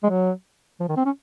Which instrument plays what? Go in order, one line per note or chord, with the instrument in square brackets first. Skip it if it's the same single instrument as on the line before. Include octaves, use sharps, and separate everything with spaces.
[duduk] G#3
F#3
F3
D#3
C4
C#4